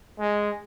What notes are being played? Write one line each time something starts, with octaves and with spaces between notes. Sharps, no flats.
G#3